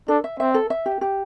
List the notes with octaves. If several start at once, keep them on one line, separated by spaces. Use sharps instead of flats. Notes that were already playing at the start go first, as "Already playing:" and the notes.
D4 A4
E5
C4 E5
A4
E5
G4
G4